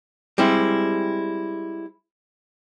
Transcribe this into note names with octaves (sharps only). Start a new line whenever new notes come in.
G3 G#3 C4 E4